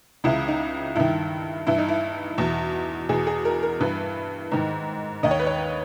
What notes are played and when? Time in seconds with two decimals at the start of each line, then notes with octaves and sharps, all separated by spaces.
0.24 C#2 C#3 E3 E4
0.48 D#4
0.95 G2 D#3 E4
1.67 G2 E3 E4
1.78 D#4
1.88 E4
2.38 E2 B2
3.09 E2 B2 G#4
3.27 G#4
3.45 A#4
3.63 A#4
3.80 G2 E3 B4
4.52 G#2 D#3
5.23 D#2 D#3 D#5
5.31 C#5
5.40 B4
5.47 C#5